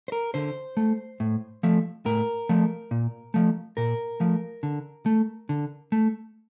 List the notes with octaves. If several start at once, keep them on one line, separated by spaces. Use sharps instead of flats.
C5
A#4
D3 C5
A3
A2
F3 A3
A2 A#4
F3 A3
A#2
F3 A3
A#2 A#4
F3 A3
D3
A3
D3
A3